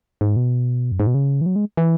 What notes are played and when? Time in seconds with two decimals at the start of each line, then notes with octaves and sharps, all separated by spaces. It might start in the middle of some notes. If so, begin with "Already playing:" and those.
0.21 G#2
0.36 B2
0.92 F#2
1.00 G#2
1.07 B2
1.14 C#3
1.41 E3
1.46 F#3
1.56 G#3
1.77 E3